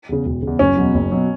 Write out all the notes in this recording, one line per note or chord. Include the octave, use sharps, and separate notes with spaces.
E2 C#3
E1
C#3
E2
F#1 C#4
E2 B2 F#3
F#1
B2 F#3